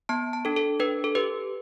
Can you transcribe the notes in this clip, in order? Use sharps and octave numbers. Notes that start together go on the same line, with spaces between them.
B3 A5
A5
D4 A4
A4
D4 B4
A4
G4 B4